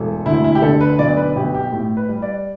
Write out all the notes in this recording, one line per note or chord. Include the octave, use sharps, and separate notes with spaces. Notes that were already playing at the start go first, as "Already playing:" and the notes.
Already playing: E1 A3 A4
D2 E4
E4
G4
D3 A4
B4
B1 D5
B4
B1 G4
G4
A2
B4
G3
D5